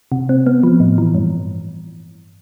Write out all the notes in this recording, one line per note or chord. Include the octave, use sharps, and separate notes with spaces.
C3
C4
B3
F3
A2
E3
G2